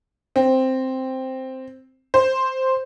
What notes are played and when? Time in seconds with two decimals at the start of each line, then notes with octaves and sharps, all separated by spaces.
0.36 C4
2.14 C5